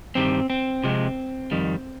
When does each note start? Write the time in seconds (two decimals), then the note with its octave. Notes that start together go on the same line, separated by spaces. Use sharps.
0.15 G2 D#3 G3 C4
0.50 C4
0.84 C3 F3 G#3
1.51 F2 D#3 G3